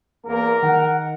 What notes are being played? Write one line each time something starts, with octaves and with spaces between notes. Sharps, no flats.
E2 A#3 A#4
D#3 F#5